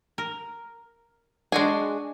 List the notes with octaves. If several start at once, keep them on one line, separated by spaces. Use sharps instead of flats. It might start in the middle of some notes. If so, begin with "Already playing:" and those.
A#4
G#3 D4 F#4 G#4 G#5